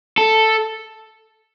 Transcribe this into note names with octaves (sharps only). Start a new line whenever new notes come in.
A4